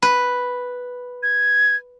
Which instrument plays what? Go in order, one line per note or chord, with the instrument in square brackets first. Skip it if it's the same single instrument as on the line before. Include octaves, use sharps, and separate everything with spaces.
[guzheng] B4
[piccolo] G#6